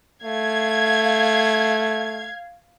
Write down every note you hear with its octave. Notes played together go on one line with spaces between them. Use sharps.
A3 F5 G#6